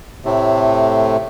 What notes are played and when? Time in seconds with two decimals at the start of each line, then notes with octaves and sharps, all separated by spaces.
0.25 A2 C3 A3